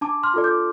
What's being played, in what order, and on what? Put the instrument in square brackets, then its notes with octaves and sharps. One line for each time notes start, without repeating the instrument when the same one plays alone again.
[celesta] D4 A5 D6
C6 F6
F4 A4 D5
D6 G6